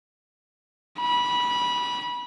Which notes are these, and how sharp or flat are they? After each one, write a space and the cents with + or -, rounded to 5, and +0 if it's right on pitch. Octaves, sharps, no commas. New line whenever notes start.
B5 -20